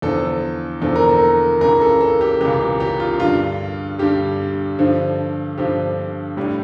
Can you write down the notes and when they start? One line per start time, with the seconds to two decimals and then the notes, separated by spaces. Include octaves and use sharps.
0.02 E2 D3 F3 A4
0.82 E2 D3 F3 A4
0.96 A#4
1.09 A4
1.61 C#2 C#3 E3 A#4
1.81 A4
2.01 A4
2.21 G4
2.41 C#2 C#3 E3 G4
2.61 G4
2.80 G4
3.00 F4
3.20 G2 D3 G3 F4
3.99 G2 D3 G3 G4
4.79 G2 D3 F3
5.58 G2 D3 F3 G4
6.37 A2 G3